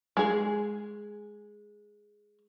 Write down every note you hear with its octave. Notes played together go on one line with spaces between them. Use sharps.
G#3 G#4